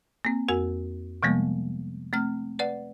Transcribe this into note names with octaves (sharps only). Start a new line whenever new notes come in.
A#3 C4
F2 F#4 A#4 G#5
C3 F3 G3 G#3 A#3 B3
A3 C4 F6
B4 D5 F#5